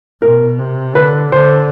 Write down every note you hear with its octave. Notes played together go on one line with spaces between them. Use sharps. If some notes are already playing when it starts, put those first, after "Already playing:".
B2 A#4
C3
D3 B4
D3 C5